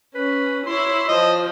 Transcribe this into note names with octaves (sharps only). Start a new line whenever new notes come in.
C#4 B4
E4 C#5 C6
F3 D#5